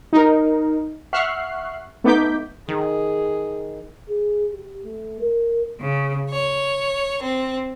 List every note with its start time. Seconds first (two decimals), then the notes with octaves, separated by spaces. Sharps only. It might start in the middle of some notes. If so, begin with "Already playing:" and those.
0.13 D#4 A#4
1.13 E5 F#5 C#6 F6 F#6 C7
2.04 A3 B3 D#4 D6 G6 B6
2.68 D#3 G#4
4.09 G#4
4.53 G4
4.85 A3
5.21 A#4
5.81 C#3
6.30 C#5
7.22 C4